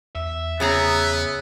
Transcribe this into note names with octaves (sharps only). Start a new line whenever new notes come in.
E2 E5
C#3 B3 G#4 A#5